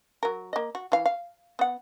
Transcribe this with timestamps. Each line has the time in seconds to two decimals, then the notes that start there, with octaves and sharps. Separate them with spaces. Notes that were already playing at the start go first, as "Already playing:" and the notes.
0.23 F#3 A#4
0.53 A#3 D#5
0.75 F#4
0.92 E3 F5
1.06 F5
1.59 B3 F#5